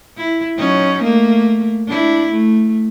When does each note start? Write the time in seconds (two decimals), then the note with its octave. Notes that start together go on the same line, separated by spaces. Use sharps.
0.17 E4
0.58 F#3 C#4 D#4
1.03 A3 A#3
1.88 D4 E4
2.32 A3